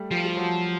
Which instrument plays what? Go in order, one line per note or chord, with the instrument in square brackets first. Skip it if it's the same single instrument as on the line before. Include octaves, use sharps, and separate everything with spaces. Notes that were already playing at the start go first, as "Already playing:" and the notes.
Already playing: [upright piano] G3 A3
[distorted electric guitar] F3 [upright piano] G3
[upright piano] G3
F#3